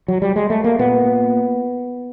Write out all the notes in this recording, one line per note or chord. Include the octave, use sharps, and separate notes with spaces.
F#3
G3
G#3
A3
A#3
A#2 B3